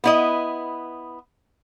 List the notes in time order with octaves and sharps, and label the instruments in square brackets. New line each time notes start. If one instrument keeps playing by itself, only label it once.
[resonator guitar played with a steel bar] B3 E4 D#5